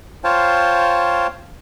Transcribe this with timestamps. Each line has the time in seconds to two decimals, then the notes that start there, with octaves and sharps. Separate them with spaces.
0.24 F4 C5 C#5 F5 G5 A5